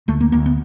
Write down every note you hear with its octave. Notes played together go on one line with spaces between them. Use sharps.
D2 A3
A#3
D2 A#3
B3